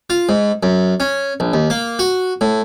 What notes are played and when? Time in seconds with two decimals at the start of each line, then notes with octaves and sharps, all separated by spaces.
0.10 F4
0.29 G#2
0.63 F#2
1.00 C#4
1.40 A#1
1.54 D#2
1.70 A#3
1.99 F#4
2.41 A2